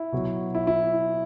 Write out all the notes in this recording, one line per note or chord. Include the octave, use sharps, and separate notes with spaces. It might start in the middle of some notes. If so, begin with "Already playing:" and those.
Already playing: E4
B2 F#3
E4
E4